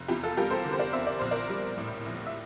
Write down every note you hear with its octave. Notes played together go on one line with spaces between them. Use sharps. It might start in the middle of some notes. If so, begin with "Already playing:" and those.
Already playing: F1
E2 E4 G4
F4 A4
G3 G4 A#4
A4 C5
D3
C5
A#4 D5
E2 C5 E5
D5
A#1 C5
A#4 D5
G3
A2
A#1
E5